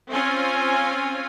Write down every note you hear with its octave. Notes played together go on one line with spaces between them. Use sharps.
C4 C#4 F4 G#5